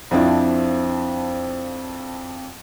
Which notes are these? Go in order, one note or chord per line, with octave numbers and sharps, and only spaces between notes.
F2 F3 C4 D4 E4